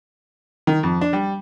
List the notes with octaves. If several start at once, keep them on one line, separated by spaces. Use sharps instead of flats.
D#3
F2
D4
G3